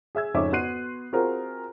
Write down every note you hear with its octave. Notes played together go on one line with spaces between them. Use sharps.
G#4 E5 E6 G#6
F2 G#2 C#3 C#4 E5 D6
B3 F#4 C6 F#6 C7 D#7
C4 F4 F#4 G#4 A#4 C5